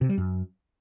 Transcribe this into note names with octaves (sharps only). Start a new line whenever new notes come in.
C3
G3
F#2